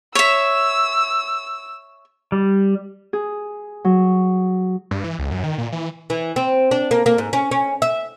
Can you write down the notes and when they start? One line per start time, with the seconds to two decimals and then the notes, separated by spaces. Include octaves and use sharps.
0.15 C#5 E5 E6
2.32 G3
3.13 G#4
3.85 F#3
4.91 G2
5.04 E3
5.19 C#2
5.31 F#2
5.44 D#3
5.58 A#2
5.72 E3
6.10 E3
6.36 C4
6.71 D4
6.91 A#3
7.06 A#3
7.18 G#2
7.33 C#4
7.51 C#4
7.82 E5